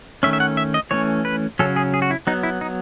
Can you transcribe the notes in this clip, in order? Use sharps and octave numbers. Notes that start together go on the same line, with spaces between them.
D#3 A3 C#4 E5
E5
F#5
E5
D#5
E3 A3 C#4 C#5
B4
C#3 F#3 C#4 A4
G#4
G#4
F#4
E4
F#3 B3 D#4
E4
D#4